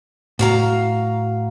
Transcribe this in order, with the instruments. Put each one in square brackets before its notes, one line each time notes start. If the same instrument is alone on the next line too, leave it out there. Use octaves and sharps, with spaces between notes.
[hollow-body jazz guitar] A2 [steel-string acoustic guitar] F#3 F5 A#5